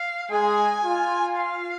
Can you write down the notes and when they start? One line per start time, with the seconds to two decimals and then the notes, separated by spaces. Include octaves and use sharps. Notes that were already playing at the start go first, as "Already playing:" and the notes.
Already playing: F5
0.31 G#3 G#4 G#5
0.84 F4
1.38 F5